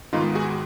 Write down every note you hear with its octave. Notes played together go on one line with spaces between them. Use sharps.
G#2 D#3 G#3 B3 D#4 F4
F#4 G#4